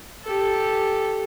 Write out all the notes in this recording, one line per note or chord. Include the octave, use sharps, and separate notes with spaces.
G4 A4